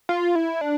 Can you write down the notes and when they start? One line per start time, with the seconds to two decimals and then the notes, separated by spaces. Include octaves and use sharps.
0.09 F4
0.35 E4
0.61 D4